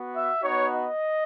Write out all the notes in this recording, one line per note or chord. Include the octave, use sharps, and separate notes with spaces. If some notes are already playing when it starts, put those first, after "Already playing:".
Already playing: B3 F#4
E5
B3 D#4 F#4 C#5
D#5